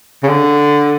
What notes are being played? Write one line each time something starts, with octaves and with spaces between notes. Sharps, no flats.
C#3
D3